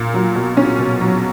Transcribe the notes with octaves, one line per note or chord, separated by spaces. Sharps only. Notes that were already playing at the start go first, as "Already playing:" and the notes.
Already playing: A#2
F#3
B2
C#4
B2
F#3